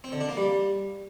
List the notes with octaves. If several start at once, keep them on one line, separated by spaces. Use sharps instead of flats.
C4
D3
D4
A#3
G3